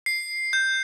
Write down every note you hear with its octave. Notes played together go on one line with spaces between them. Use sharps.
C7
G6